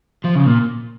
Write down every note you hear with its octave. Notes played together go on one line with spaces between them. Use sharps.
F3
C#3
A#2